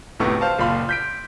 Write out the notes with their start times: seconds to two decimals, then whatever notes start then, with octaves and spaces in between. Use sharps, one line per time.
0.20 F1 D2 A2 C3 B3 C#6
0.41 C5 F5 A5
0.59 F#1 A#2 F5 B5 C6
0.89 G6 B6 D7